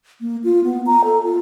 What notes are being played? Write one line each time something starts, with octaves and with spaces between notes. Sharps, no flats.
A#3
F4
B3
A#5
A4
F4